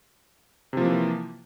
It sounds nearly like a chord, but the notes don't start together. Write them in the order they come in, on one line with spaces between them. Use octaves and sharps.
C3 F3 A#3 E3